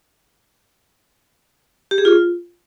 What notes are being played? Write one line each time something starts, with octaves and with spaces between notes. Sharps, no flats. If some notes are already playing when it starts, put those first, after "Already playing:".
G4
G#4
F4